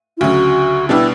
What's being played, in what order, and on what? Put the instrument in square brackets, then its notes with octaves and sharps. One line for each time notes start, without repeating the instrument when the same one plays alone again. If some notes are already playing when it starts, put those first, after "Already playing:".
[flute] E4
[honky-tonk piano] D2 C#3 F#3 [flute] F#4
[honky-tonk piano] B2 G3 B3 D4 G4 [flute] E4